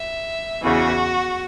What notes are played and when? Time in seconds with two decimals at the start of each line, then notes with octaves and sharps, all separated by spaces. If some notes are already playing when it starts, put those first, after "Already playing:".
Already playing: E5
0.62 E2 C#3 E3 F#4